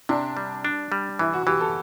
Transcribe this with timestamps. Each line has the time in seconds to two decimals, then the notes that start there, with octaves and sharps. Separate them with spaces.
0.09 C3 D4
0.37 G3
0.65 D4
0.92 G3
1.19 E3 E4
1.33 F#4
1.46 E3 G4
1.61 A4